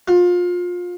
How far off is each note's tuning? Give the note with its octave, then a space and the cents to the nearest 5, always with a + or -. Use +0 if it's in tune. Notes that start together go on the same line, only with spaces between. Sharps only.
F4 +25